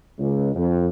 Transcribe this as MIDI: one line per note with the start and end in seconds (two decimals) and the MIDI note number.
0.19 0.50 37
0.55 0.88 41